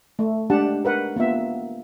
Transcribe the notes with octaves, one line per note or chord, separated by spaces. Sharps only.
A3
G#3 D4 G4 F#5 A5
A#4 B4 F#5
A#3 B3 F4 E5